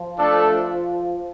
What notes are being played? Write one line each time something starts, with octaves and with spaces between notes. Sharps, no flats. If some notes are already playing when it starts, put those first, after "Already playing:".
Already playing: F3
A3 D4 A4